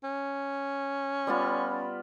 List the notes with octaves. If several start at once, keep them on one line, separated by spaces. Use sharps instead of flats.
C#4
G3 B3 F4